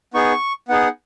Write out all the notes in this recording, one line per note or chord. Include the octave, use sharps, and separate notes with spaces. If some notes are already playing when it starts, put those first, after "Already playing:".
B3 D#4 G#4 C#6
B3 D#4 G#4 F#5